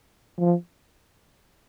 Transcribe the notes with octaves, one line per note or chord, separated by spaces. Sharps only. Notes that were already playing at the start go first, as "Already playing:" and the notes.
F3